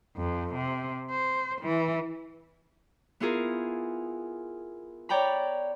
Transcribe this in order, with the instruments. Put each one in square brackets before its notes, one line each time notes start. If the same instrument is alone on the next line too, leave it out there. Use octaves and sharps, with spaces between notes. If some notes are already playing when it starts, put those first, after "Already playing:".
[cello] F2
C3
C5
E3
[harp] B3 E4 F4 G#4 A#4
C#5 D5 G5 A#5 B5